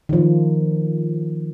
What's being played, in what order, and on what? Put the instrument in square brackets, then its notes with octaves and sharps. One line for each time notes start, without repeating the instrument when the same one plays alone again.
[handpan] D#3 F3